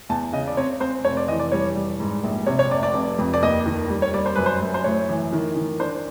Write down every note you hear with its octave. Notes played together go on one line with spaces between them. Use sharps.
E2 A5
C#3 D#5
D5
C4 C#5
C4 C5
F1 C#5
D5
E3 D#5
D5
G3 C#5
G3
G#2
A#1
C3 C#5
C#5
F1 D5
D5
F1
F2
D5
D#2 D#5
D#3
G3
C#5
G3 D5
C5
F#2 B4
C5
F#2
C5
A2 C#5
E3
D#3
D#3
D4 C5